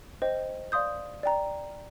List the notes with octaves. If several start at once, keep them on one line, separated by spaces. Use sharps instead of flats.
C5 D#5 G5
D5 F5 C6 D#6 G6
D5 G5 A#5